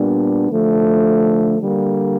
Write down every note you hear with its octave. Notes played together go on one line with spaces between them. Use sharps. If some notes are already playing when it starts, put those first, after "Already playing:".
Already playing: A#2 G3 B3 D4
D3 F3 A3
D3 G3 A#3